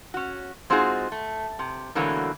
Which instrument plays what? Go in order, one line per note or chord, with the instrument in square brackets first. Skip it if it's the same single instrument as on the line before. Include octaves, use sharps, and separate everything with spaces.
[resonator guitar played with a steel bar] C#4 F#4
G#3 C4 D#4 F4 F#4 G#4
A3
C3
B2 D3 E3 F#3 A3 A#3